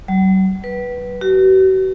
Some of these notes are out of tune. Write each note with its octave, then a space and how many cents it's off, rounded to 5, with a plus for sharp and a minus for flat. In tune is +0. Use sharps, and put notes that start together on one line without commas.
F#3 +45
B4 -10
F#4 +45